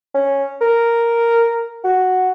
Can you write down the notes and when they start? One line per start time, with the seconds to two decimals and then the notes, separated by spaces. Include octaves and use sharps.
0.15 C#4
0.61 A#4
1.84 F#4